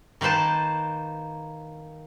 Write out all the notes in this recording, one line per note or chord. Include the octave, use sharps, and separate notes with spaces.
D#3 A#3 B4 C5 A5